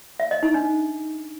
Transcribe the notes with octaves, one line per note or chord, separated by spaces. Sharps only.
E5
D#5
D#4
D4